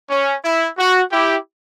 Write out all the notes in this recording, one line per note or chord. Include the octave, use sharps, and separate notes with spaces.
C#4
E4
F#4
E4 G4